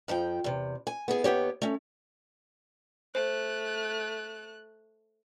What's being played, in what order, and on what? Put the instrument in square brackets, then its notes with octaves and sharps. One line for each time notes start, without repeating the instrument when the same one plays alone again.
[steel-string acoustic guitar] F2 F3 A4 G5
E2 C3
G#5
B3 E4 G#4
D#2 B3 G4 C#5
A3 C#4
[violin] A3 F#6 [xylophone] C5